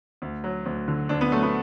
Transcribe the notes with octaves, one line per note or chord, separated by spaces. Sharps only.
D2
F#3
D2
D3
D2 D4
B3
F#3 A3
B3